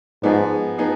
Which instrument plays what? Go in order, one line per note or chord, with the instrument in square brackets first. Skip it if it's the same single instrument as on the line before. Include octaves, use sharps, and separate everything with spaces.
[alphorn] G#2 [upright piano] F3 B3 D#4 G#4
[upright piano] F3 B3 D#4 G#4